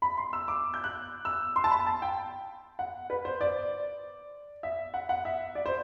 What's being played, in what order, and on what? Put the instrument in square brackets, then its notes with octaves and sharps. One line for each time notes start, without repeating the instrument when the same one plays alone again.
[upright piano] B5
C6
E6
D6
G6
F#6
E6
C6
A5
B5
A5
G5
F#5
B4
C5
D5
E5
F#5
F#5
E5
D5
C5